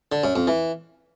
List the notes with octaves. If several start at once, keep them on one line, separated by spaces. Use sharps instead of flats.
D3
F#2
F2
E3